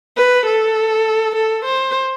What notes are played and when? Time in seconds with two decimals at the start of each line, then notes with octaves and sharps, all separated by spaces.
0.17 B4
0.46 A4
1.36 A4
1.65 C5